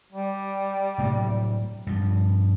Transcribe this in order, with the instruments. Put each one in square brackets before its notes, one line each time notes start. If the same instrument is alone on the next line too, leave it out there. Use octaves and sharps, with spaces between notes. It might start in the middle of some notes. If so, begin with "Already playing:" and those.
[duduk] G3
[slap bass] A2 C3 F#3
G2 F3